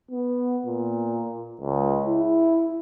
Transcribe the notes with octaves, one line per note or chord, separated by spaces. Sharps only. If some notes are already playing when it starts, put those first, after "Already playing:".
B3
A#2
C#2
E4